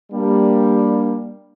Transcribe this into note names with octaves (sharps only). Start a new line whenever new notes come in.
G3 A#3 D4